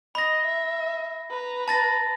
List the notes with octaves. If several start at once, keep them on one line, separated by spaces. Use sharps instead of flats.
D#5 B5 A#6
E5
B4 A#5
A5 A6 A#6